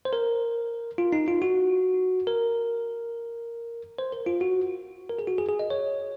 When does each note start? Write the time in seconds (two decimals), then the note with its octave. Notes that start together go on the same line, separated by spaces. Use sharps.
0.05 C5
0.13 A#4
0.98 F4
1.13 D#4
1.28 F4
1.42 F#4
2.27 A#4
3.99 C5
4.13 A#4
4.26 F4
4.41 F#4
5.09 A#4
5.19 G#4
5.27 F#4
5.38 G#4
5.49 G#4
5.59 D#5
5.70 C#5